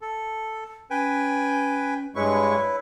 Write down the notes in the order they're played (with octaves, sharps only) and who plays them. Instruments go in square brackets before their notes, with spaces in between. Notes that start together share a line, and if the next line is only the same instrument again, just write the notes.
[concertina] A4
[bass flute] C#4 [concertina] B4 G5 G#5
[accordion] G2 G#3 C#6 [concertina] E4 B4 [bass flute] C#5